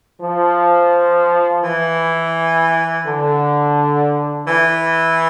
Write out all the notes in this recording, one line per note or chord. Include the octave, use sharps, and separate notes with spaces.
F3
E3
D3
E3